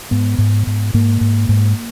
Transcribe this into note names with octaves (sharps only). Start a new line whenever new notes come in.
G#2 B3
G#2
G#2
G#2 A#3
G#2
G#2